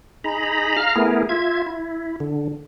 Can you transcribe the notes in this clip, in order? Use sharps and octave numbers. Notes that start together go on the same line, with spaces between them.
D#4 G#4 A#5 B5
F5 A#5 F6
A3 B3 E4 G#4 A#4
F4 E5 G#6
E4
D3